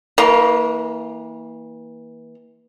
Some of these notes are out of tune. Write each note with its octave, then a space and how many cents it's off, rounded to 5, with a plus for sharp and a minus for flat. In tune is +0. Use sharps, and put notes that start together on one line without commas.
E3 -30 A#3 +0